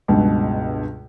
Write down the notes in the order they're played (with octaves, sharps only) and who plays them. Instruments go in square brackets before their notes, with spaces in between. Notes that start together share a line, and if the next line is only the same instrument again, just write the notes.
[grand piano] C#2 G2 B2